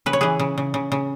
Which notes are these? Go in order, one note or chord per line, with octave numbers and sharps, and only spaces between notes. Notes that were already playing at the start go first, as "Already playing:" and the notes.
C#3 B4
C#5
E3 G#4 B4
C#3
C#3
C#3
C#3